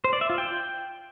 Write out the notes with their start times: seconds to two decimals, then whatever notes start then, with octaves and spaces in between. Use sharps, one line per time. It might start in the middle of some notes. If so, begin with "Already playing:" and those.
0.04 C5
0.13 D5
0.21 E5
0.30 F4
0.38 G5